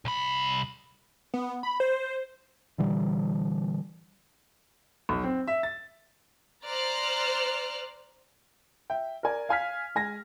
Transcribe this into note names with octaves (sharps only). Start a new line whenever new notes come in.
C2 B5
B3
B5
C5
A#2 D3 E3 G3
B1
C4
E5
A6
C5 D5 A#5 F6 F#6
E5 G5
A#4 D5 G#5
F5 G#5 F6 B6
G#3 G#5 A#6